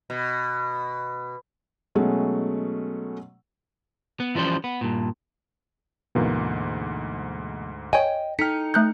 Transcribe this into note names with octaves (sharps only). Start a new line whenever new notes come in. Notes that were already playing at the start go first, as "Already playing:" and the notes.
B2
B2 F#3 G#3 A3 C#4
B3
E3 F3 G3 C#4 C5
B3
G2 A#2
D2 G#2 B2 E3 A#3
C#5 D#5 G5 G#5
D#4 A4 G5 F6 B6 C#7
A3 F#6 G6